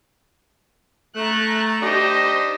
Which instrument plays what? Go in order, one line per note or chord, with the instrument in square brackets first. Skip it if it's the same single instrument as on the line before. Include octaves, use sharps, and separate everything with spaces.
[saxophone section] A3 [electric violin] A#5 F#6
[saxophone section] D4 D#4 G4 [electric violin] C5 A#6